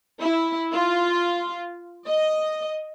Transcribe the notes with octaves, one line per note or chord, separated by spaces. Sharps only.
E4
F4
D#5